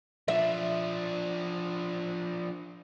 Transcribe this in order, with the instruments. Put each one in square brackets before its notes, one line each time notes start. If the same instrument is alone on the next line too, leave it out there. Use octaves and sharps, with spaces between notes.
[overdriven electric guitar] F3 D4 [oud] E5